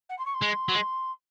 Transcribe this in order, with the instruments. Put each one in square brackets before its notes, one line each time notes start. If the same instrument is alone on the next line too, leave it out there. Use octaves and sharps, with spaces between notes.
[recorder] F#5
C6
C#6
C6
[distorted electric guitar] G#3
F#3
G#3